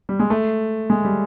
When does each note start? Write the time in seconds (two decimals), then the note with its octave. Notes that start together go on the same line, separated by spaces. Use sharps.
0.09 G3
0.19 G#3
0.30 A3
0.90 G#3
1.05 G3